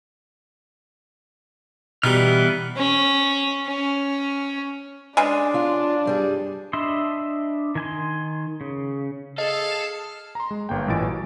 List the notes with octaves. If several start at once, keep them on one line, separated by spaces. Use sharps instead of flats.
B2 E3 G3 B3 D#4 F6
C#4
C#4
C#3 G#3 D4
F4
G2 G3 G#4
D4 D#5 E5 B5 C6
D#3 G#5 C6
C#3
G#4 A4 D#5 F5
A#5 C6
G#3
G1 A#3 G5
A1 A#2 E3 G#5 A6 D7
F#3